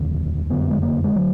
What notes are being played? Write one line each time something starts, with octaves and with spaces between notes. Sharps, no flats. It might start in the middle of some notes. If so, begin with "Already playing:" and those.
Already playing: F1 D#2 D3
F#1 F2 D3 B3
G#3
A#3
G#3
D3 F#3